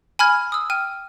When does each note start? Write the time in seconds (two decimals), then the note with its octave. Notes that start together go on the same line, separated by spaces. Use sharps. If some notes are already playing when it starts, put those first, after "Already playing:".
0.19 G#5 B5 F6 G#6
0.52 D#6 E6
0.70 G5 F6 D#7